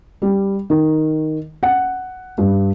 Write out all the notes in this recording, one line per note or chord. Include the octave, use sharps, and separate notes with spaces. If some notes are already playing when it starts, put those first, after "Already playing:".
G3
D#3
F#5
G2